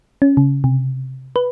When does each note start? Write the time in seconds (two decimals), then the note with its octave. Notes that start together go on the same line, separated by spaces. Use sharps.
0.22 C#4
0.37 C#3
0.64 C3
1.36 B4